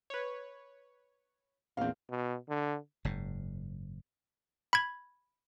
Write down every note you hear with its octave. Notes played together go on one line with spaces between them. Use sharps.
B4 C#5
A#1 E2 C4 F5
B2
D3
F#1 G#2
B5 G#6